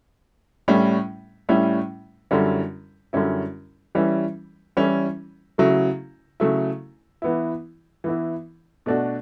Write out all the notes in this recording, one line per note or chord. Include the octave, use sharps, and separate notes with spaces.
A2 G3 C#4 E4
A2 G3 C#4 E4
F#2 D3 G3 C#4 E4
F#2 D3 G3 C#4 E4
E3 G3 C#4 E4
E3 G3 C#4 E4
C#3 F#3 A3 E4
C#3 F#3 A3 E4
E3 B3 E4
E3 B3 E4
B2 A3 D4 F#4